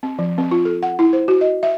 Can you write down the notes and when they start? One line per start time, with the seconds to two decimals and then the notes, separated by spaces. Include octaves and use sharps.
0.03 C4
0.19 F3
0.38 C4
0.51 F4
0.65 A4
0.83 F#5
0.99 E4
1.13 C5
1.28 F#4
1.41 D#5
1.63 E5